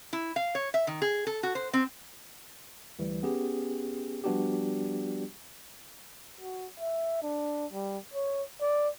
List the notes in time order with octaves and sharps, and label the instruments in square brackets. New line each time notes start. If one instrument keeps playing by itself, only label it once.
[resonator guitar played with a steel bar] E4
F5
C#5
E5
D#3
G#4
A4
F#4
C5
C4
[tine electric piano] D2 E3 G3
B3 C#4 G4 G#4
F3 G3 B3 D4 F#4 G4
[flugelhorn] F#4
E5
D4
G3
C#5
D5